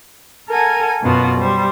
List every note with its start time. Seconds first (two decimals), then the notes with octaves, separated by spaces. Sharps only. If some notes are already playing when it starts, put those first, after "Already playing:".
0.48 A4 A#4 F#5 G#5
1.01 F#2 B2 B3 F4 F#4
1.39 G3 C5